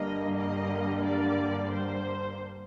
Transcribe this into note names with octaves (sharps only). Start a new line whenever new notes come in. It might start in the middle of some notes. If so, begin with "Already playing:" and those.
Already playing: G2 D3 G3 A#3 D#5
D#5
D5
C5